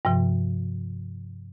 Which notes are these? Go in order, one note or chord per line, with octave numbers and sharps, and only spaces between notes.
G2 C3 F3